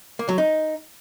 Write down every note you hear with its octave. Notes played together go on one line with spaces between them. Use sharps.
A#3
F#3
D#4